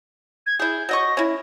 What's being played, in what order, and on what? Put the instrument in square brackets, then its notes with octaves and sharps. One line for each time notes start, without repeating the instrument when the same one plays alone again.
[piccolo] G#6
[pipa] E4 G#4 [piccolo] G6
[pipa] F#3 D#5 C#6 [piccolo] A#6
[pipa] C#4 E4